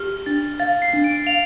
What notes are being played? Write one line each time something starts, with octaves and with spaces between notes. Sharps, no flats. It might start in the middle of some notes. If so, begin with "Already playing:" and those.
Already playing: G4 F6
D4 A6
F5 A6
C7
D4
D7
F5 F7